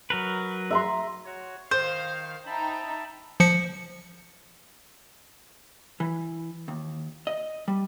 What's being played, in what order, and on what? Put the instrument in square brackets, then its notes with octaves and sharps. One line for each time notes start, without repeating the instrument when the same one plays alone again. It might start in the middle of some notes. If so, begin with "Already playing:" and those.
[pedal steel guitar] F#3 A#4 B4
[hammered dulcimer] E5 A#5 C6
[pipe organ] F#4 C#5
[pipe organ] D#3 [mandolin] C5 [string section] F5 [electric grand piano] G6
[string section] D#4 G5 [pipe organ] E5 A5 B5
[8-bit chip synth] F3 C#7
[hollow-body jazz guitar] E3
D#2
D#5
G3